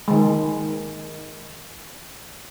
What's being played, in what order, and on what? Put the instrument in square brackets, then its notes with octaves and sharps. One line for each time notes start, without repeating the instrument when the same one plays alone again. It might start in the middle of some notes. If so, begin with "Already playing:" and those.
[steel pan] D#3 G#3